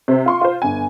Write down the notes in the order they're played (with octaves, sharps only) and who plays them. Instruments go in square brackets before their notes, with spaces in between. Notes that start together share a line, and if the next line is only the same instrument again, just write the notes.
[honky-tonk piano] C3 C4
F4 C6 C#6
F4 C5
G1 G#5